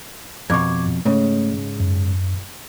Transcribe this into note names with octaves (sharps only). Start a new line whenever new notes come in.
F2 B2 C#6 D6 G#6
G#2 C#3 A3 C#5
F#2